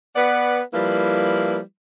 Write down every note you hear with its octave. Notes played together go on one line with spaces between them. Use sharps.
B3 B4 D5 F#5
F3 G3 A#3 E4 B4